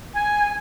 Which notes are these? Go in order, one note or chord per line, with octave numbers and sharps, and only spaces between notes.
G#5